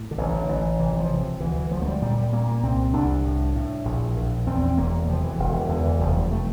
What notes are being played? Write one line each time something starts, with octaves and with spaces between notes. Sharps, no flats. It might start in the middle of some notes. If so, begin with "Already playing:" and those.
Already playing: A2
D3
A1 E3
D3
A1 E3
C3 E3
E3
F3
C3
F3
D2 E3
E3
D2 F3
A3
G3
A#2 G3
G3
A#2 A#3
A#3
C2 C4
C2 D4
A2
A2
A#1
A#1
E2 C4
C4
E1 A#3
C3 F3
E3
E1
E3
E2 D3
E3
F1 F3
G3
C3 A3